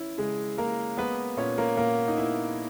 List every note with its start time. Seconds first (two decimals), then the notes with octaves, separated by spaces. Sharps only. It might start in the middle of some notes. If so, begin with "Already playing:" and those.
Already playing: E3 C#4 E4
0.18 C#3 G#3 G#4
0.58 A#3 A#4
0.97 G#3 B3 B4
1.37 A#2 C#4 C#5
1.58 A#3 A#4
1.77 A#2 A#3 A#4
2.08 D#4
2.18 B3 E4